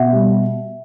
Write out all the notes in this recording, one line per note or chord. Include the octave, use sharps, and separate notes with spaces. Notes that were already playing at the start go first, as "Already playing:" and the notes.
Already playing: B2 E5 F#5
G3